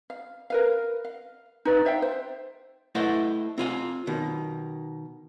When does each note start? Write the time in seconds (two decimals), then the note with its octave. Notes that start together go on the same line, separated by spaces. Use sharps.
0.10 F5
0.50 A#4 B4 F5
1.05 F5
1.65 D#4 B4 D5
1.85 C5 E5 F5 G5
2.02 C5
2.95 A3 E4 B4 C5 D#5 F#5
3.58 C4 F4 G#5
4.07 B2 D#3